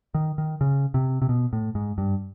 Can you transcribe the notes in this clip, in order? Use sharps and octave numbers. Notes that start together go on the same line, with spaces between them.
D#3
D#3
C#3
C3
C3
B2
A2
G#2
G2